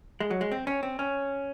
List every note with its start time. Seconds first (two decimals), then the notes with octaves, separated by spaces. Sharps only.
0.20 G#3
0.31 F#3
0.41 G#3
0.51 C4
0.67 C#4
0.83 C4
0.99 C#4